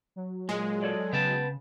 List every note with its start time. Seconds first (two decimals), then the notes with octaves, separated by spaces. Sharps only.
0.16 F#3
0.49 A#2 G#3
0.83 A4 C#5 D5
1.13 C#3 B3 G5 A5